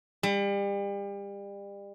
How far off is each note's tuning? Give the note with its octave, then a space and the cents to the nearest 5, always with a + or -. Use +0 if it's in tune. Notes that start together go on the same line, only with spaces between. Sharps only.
G3 +35